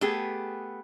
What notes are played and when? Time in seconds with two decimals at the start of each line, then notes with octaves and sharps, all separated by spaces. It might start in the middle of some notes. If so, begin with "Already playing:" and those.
0.01 A3 B3 G4 G#4